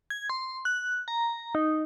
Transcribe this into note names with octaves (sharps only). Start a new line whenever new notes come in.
G#6
C6
F#6
A#5
D#4